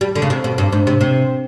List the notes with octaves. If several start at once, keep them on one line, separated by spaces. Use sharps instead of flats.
G3
D3
C#3
C3
B2
G2
G#2
C3
C3